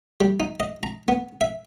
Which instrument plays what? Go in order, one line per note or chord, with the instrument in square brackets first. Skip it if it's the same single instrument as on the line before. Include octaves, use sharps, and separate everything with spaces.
[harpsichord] G3
D#4
D#5
A#5
B3
E5